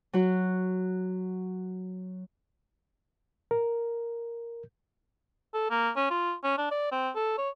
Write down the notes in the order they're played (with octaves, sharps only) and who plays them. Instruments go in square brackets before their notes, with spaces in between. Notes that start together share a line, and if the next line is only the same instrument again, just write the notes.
[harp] F#3 F#4
[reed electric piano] A#4
[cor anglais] A4
A#3
C#4
F4
C#4
D4
D5
C4
A4
C#5